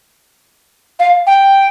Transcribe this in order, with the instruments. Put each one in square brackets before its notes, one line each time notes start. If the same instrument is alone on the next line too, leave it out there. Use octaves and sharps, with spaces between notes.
[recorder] F5
G5